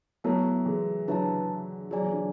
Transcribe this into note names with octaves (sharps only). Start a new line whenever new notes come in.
F#3 A3 B3 E4 A4
E3 G#3
D3 F#3 E4 B4 E5 A5
F#3 G#4 D5 G#5
E3
D3 F#3